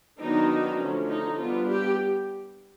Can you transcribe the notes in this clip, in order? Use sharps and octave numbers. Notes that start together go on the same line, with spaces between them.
D#3 F#3 B3 D4 D#4
D3 F3 A3 C#4
D#4
G3 B3 D4 F4
G4